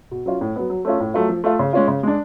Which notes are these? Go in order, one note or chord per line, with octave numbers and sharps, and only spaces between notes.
B2
F#3 C#4 F4
A2
F#3 B3
F#3
A3 C#4 F4
A2
F#3 A3 F4
F3
A3 F4
C#3
G#3 C#4 F4
C#3
G#3 D4